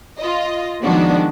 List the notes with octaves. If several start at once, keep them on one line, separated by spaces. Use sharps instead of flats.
F4 D#5
D#3 F3 G#3 B3 D4 F#4